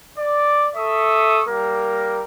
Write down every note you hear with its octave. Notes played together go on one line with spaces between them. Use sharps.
D5
A4 E5 C#6 D#6
G3 A#3 A#4